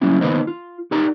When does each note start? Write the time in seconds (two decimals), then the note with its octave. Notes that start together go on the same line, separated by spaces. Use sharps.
0.02 F#3 G3 A#3 C#4 E4
0.21 D#3 A#3 B3 B4 C5 D#5
0.47 F4
0.91 D#4 G4 A#4 D5 A#5